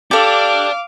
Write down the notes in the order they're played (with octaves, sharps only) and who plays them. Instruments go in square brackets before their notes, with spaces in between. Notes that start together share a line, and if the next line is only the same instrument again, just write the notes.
[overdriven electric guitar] D4 [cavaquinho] G4 A4 [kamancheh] F5 D6